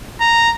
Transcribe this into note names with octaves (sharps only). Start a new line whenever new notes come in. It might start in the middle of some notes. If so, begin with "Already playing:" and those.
A#5